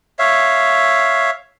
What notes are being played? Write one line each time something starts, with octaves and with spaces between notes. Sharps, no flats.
C#5 E5 F5